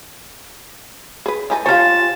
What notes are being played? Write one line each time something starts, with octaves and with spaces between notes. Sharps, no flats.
G#4 B4
E3 D#4 A4 G#5
F4 G4 C5 C#5 F5 A5